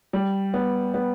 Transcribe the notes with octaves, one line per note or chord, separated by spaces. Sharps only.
G3
B3
B3